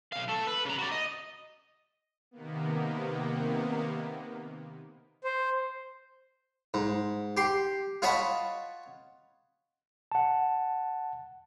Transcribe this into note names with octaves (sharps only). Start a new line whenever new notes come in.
B1 F5
A3 A4
B4
C#3 A#5
F#4 D5
D#5
C3 D#3 A#3 B3
C5
G#2
G4 C6
F4 F#4 C#5 D#5 A5 B5
F#5 A5